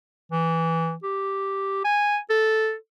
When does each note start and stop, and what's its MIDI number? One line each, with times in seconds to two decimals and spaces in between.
0.32 0.94 52
1.03 1.81 67
1.84 2.18 80
2.30 2.74 69